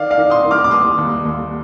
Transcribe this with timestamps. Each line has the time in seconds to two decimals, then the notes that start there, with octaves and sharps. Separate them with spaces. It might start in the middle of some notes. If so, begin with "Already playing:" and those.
Already playing: D#3 D5 F5
0.11 D5 F5
0.17 D#3
0.30 C6 D#6
0.45 D#3
0.51 D6 F6
0.64 D6
0.71 D#2 C6 D#6
0.98 D#2
1.25 D#2